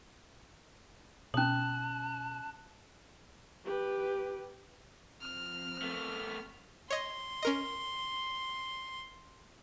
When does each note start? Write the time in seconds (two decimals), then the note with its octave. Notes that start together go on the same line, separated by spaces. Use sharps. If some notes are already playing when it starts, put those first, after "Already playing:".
1.34 B2 C#4 A5 D#6 F#6 F#7
3.65 G4 B4
5.21 F3 C4 F6
5.82 A3 B3
6.90 C#5 D#5 C6 G#6
7.42 C#4 A#4 D#5